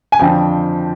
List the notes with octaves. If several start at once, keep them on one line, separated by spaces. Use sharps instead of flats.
G#5
F2 D3 F3 G5